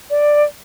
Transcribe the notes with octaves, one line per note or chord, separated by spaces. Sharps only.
D5